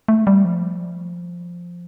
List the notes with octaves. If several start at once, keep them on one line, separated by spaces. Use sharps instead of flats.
A3
G3
F3